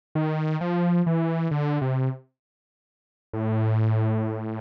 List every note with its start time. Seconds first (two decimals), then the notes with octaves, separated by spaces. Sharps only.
0.15 D#3
0.61 F3
1.06 E3
1.51 D3
1.81 C3
3.33 A2